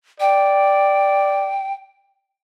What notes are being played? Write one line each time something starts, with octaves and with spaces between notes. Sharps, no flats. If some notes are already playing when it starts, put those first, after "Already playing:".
D5 G5